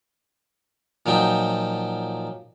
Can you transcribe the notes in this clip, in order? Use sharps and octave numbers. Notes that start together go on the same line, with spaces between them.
A#2 F3 F#3 D#4 G5